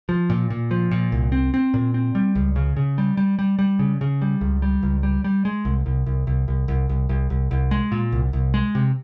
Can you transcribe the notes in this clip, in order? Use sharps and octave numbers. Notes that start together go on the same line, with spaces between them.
F3
A#2
A#2
F3
A#2
C2
C4
C4
A#2
C4
G3
C#2
C#3
C#3
G3
G3
G3
G3
C#3
C#3
G3
C#2
G3
C#2
G3
G3
G#3
C2
C2
C2
C2
C2
C2
C2
C2
C2
C2
G#3
A#2
C2
C2
G#3
C3